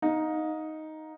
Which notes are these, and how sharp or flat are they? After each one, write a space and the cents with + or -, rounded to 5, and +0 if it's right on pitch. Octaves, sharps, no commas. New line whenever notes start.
D#4 +5 F5 +35